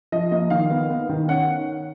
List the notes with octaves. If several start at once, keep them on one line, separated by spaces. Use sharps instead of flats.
F3 D#5
A#3 D#5
D#3 F5
B3
B3
D#3
C#4 F#5